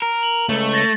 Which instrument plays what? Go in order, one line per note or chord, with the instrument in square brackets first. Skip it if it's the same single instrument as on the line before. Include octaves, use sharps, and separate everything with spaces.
[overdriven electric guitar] A#4
[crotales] F#7
[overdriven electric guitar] C#2 [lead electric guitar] A3
[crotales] A6 A#6